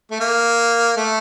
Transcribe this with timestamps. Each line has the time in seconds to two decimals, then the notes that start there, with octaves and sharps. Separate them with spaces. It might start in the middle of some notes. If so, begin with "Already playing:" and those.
0.11 A3
0.20 A#3
0.97 A3